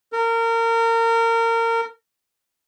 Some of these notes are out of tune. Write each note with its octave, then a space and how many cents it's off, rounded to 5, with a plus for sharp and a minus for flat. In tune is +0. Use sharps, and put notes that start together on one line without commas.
A#4 -25